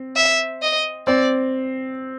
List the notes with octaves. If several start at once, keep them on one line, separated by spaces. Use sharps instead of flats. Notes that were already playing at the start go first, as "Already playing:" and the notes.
Already playing: C4
E5
D#5
C4 D5